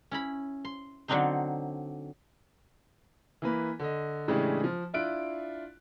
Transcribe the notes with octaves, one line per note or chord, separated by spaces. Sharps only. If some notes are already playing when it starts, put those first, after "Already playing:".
C#4 E4 B5
C6
D3 F#3 C4 D4 D#4 C5
E3 A#3 B4
D3 D#5
A2 C#3 E3 G#3 D4 G4
F3
D4 E4 F4 F#6 D7